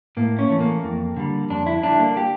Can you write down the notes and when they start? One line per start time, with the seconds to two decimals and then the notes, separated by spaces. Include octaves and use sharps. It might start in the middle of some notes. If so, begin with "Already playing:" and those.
0.17 A2 A#3
0.39 C#4
0.50 E3 A3
0.61 A#3
0.84 F2
1.16 D3 G3
1.50 F2 D4
1.67 E4
1.83 D3 G3 D4
2.00 A#3
2.17 G4